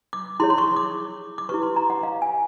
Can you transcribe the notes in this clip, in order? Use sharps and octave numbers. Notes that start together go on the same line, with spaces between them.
D6
E4 G#4 C#5 C6
C6
C#6
D6
D6
E4 G4 B4 C#6
C6
A#5
F#5
F5
G#5